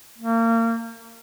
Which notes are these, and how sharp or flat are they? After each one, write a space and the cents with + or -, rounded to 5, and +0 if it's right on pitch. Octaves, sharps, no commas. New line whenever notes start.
A#3 -30